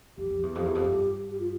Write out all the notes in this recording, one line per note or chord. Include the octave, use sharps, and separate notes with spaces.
F2 G4
F2
E2
F2 G4
E2
F2
G2
G4
F4